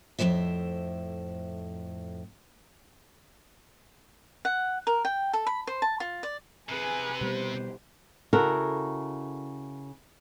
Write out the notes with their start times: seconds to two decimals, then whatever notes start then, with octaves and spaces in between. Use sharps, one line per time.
0.19 F2 A2 C#3 C5 E5
4.45 F#5
4.87 A#4
5.05 G5
5.33 A4
5.47 B5
5.67 C5
5.82 A5
6.00 F4
6.23 D5
6.69 C3 G#4 B4 G#5
7.21 B2 G3 B3 G4 C5
8.33 C#3 E4 F#4 A4 A#4